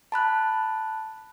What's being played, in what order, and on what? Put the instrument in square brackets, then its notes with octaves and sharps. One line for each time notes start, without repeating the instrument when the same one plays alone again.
[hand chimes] A5 B5 F#6